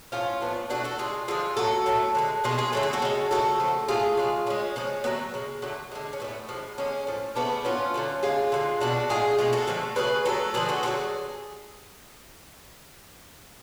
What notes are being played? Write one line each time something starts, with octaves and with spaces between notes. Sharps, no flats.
A2 F3 A3 C#4 F4
A2 F3 A3 B3 D4
B2 A3 D4 F#4
F#4 A4
C#3 G#3 F4 G#4
D3 F3 G#3 F4 G#4
A2 F#3 A3 F#4 A4
A2 F#3 A3
D3 F3 G#3
B2 G#3 F4 G#4
F4 G#4
D3 F#3 A3 A4
G#4
F#4 A4
C#3 G#3
C#3 F#3 A3 F#4 A4
C#3 F3 A3
A2 G#3 F4 G#4
C#3 G#3
D3 G#3 C#4
C#3 F3 G#3
D3 F#3 A3 B3
C#3 G#3
D3 F#3 A3
D3 G#3
C#4
A2 F#3 A3 B3
D3 F3 G#3
D3 G#3 C#4
A2 F3 A3
C#3 F3 A3 B3 D4
A2 F#3 A3 C#4 F4
D3 F#3 A3
D3 G#3 F4 G#4
D3 F3 G#3
B2 G#3 D4 F#4
A2 G#3 F4 G#4
B2 G#3 F4 G#4
F#4 A4
D3 F3 A3
C#3 F#3 A3 G#4 B4
D3 F#3 A3 F#4 A4
D3 F3 G#3 G#4 B4
F#4 A4
D3 F#3 A3 F4 G#4